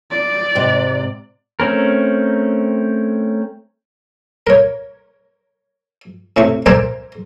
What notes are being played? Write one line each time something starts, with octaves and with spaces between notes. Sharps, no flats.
D5
G#2 C3
A3 C4 C#4 A#4
A#4 C#5
A2 C3 C#6
A#4 C5 D5 E5 G#5 A#5